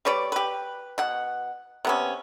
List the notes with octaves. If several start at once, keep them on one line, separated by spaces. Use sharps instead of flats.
G3 B4 C#5 D5
G4 B4
B2 F#5
C3 B3 C#4